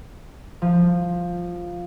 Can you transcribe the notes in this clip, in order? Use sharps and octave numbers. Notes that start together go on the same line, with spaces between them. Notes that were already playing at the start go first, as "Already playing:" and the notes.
F3